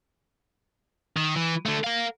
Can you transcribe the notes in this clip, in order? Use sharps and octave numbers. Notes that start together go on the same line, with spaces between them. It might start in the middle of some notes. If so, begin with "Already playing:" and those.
D#3
E3
D3 A3
A#4 F5